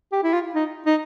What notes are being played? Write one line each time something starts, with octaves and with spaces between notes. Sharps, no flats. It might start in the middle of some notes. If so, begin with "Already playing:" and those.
G4
E4
F4
D#4
D#4